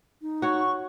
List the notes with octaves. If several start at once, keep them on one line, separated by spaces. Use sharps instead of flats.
D#4
F#4 C#5 C#6